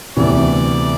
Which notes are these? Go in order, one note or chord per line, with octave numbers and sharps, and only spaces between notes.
D2 C3 E3 B3 D5